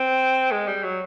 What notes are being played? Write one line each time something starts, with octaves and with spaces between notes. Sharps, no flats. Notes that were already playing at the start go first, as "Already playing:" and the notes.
Already playing: C4
G#3
G3
F#3